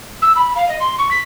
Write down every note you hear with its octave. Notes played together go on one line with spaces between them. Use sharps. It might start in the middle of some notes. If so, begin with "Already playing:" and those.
E6
B5
F5
D#5
C6
C#6
B6